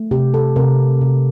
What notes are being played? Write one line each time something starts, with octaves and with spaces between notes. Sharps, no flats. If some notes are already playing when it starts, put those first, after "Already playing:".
Already playing: A3
C3 G4
A4
C3 A#4
C3